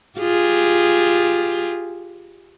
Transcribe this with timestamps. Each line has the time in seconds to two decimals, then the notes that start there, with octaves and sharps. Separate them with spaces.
0.19 F4 G4 G#4